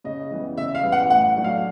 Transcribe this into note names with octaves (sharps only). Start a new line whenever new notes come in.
C#3 D#5
E3 G3 B3
C#3 E5
F5
E3 G3 B3
F#5
A2 F#5
F#3 A3 D4 F#4
F5